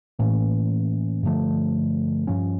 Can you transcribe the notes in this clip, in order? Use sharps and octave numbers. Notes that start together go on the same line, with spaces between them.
A2 E3 A#3 C#4
G2 D3 F3 A3
G2 F3 C#4